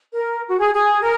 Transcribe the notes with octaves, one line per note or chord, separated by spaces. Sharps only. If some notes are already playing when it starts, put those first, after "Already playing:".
A#4
F#4
G#4
G#4
A#4